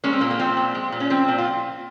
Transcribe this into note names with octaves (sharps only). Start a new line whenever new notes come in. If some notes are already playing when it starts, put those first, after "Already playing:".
G#3 A#3 C#4
C4
A#2 A#3
A#3
F3 C4
A#2
G#3
A#2
C#4
F3 C4
A#2
F4